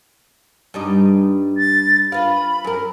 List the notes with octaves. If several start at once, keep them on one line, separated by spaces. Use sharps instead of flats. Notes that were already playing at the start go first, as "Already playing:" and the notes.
G2 G3 D#4
A6
F4 B4 F5 B5
F#2 A#4